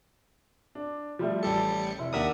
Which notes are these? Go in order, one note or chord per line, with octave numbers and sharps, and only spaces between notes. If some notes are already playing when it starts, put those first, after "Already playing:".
D4
F3 G3 A3
A1 G3 A4 C#7
F1 E4
D#2 D4 A#4 E5 F#5 D#6